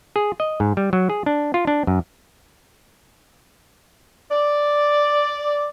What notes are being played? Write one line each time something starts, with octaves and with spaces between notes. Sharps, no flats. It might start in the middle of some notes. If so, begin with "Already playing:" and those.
G#4
D#5
G#2
G3
F#3
G#4
D4
F4
D4
F#2
D5